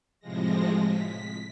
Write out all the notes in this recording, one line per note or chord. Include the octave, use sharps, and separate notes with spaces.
A2 C3 F3 G#3 A#6
B6